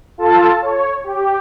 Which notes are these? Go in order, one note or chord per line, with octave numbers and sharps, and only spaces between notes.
F4 A4 A5
C#5
G4